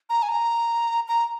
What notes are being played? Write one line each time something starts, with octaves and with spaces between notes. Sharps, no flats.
A#5
G#5
A#5
A#5